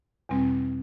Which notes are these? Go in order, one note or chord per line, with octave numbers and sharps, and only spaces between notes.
E2 B2 G3 C4